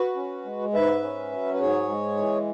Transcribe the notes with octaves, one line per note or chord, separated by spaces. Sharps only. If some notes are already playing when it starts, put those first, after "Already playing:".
Already playing: F#4 B4
C#4
G#3
G#2 B4 E5
C#4
F#3
B4
G#2 G#4 C#5
G#3
E3